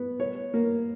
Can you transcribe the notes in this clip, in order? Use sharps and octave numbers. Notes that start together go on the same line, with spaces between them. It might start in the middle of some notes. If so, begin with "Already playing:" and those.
Already playing: B3
C#5
A#3